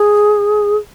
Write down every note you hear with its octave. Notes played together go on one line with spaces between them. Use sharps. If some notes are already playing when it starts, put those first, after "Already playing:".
Already playing: G#4